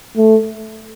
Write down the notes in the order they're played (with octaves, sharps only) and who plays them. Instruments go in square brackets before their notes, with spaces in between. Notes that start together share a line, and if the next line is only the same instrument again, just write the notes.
[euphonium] A3